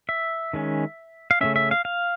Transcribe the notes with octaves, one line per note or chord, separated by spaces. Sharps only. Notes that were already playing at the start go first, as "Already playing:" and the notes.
E5
D#3 G#3 C#4
F5
C#3 F3 A3 C#4 E5
E5
F5
F5